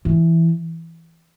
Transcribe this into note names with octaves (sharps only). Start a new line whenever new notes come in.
E3